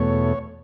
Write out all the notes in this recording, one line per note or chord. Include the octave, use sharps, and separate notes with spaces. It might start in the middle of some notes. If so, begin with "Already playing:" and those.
Already playing: E2 B2 A3 C#5